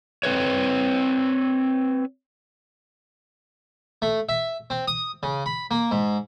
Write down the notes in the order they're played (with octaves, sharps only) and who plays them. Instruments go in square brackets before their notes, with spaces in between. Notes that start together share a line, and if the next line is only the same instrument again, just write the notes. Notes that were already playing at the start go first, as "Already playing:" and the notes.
[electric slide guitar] C4 B4 C#5
[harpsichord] A3
E5
C4
D#6
C#3
B5
A#3
G#2